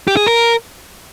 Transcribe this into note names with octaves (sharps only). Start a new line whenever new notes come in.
G4
G#4
A#4